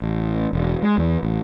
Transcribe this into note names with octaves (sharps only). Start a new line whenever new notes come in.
A1
E1
G#3
E2
A1